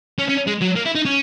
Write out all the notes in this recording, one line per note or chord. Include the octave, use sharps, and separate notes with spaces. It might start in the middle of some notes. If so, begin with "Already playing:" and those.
C#4
C#4
G#3
F#3
A#3
E4
D#4
C#4